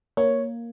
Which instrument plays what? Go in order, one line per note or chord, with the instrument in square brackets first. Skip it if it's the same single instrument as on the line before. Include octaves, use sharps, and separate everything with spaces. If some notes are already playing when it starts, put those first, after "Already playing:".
[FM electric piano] A#3 [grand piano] C#5